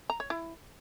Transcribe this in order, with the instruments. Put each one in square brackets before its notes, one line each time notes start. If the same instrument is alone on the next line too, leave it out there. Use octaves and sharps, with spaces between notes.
[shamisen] A#5
C#5
E4